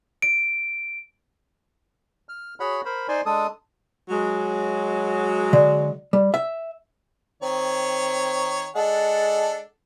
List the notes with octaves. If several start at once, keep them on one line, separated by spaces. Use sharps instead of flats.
D7
F6
F#4 G#4 C#5 F#5 B5
A#4 C5 B5
D#4 C5 D5 G#5 C6
G#3 D4 A4 D#6
F#3 G#3
D3
G3
E5
D#3 C4 C#5
G#3 D4 A4 F#5